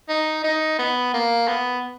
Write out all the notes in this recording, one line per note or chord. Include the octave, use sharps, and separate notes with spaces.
D#4
D#4
B3
A#3
B3